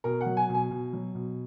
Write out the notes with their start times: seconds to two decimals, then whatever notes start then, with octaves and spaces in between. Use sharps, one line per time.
0.04 B2 A#4
0.21 F#5
0.26 F#3
0.37 G#5
0.49 B2
0.55 G#5
0.71 B2
0.93 F#3
1.15 B2